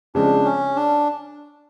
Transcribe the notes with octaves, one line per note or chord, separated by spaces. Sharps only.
C#3 F3 G#3 C4 D4
C#4
D4